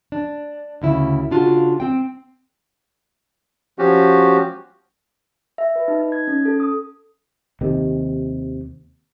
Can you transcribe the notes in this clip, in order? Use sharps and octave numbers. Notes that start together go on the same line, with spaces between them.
D4
D2 C#3 E4
C#3 D4 F4 F#4
C4 G5
F3 C#4 F#4 G4
E5
B4
D#4
D#4
G#6
C#4
A4
D#6
D#2 C3 D#3